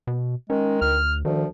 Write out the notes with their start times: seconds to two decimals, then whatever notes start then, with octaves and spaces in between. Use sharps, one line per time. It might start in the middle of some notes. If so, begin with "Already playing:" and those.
0.07 B2
0.50 D#3 G#3 C#4
0.82 D2 F6
1.25 D2 D#3 F3